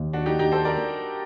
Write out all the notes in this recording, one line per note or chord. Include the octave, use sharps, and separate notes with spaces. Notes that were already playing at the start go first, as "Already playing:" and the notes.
Already playing: D#2
D4 F#4
D#4 G4
D#4 G4
A4 C5
A#4 D5